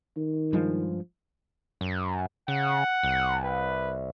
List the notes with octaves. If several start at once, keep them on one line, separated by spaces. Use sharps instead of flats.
D#3
G2 F3 G#3
F#2
C#3 F#5
C2
B4